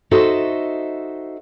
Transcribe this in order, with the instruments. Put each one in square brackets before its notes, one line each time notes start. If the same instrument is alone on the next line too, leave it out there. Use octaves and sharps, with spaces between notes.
[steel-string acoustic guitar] D#4 F#4 A4 C5 D#5 E5